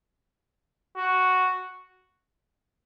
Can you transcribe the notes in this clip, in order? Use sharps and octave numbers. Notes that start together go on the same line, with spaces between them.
F#4